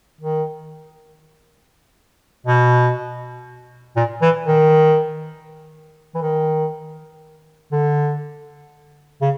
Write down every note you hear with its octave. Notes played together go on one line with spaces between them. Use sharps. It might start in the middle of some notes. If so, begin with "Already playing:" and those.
D#3
B2
A#2
E3
D#3
E3
D#3
D3
C#3